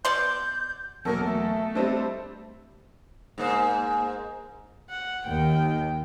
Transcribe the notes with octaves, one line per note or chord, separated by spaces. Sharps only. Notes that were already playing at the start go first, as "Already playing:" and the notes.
B2 D5 C6 G6
E2 B2 F#3 A#3 A4 A#4
A3
G3 C4 D4 A4 C5 D#5
G#2 A#3 C5
F#5
D#2 D#3 G5